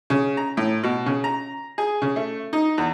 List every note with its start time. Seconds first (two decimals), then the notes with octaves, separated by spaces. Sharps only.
0.10 C#3
0.37 A#5
0.57 A2
0.83 B2
1.06 C#3
1.24 A#5
1.78 G#4
2.02 C#3
2.16 A3
2.53 D#4
2.78 E2